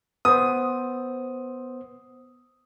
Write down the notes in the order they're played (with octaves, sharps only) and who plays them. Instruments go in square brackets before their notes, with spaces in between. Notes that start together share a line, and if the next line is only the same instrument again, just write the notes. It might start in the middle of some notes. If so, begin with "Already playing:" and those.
[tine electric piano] B3 C5 [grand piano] D#6